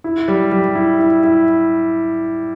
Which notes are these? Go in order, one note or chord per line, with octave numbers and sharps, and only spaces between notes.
E4
G3
G3
E4
E4
E4